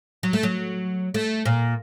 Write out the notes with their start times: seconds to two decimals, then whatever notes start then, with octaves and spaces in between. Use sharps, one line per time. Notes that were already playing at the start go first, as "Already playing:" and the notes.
0.23 F#3
0.33 A3
0.43 F#3
1.14 A3
1.45 A#2